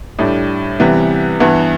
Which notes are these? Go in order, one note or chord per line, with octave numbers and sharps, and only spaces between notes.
A2 G3 D4
C3 E3 G3 B3
G2 E3 B3